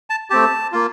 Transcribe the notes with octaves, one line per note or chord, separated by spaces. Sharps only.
A5
A3 C4 G4 A5
A#3 F4